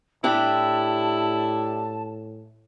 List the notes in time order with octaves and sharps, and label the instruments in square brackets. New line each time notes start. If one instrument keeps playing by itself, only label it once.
[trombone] A2 [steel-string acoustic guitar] D4 G4 [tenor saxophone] E4 [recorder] A5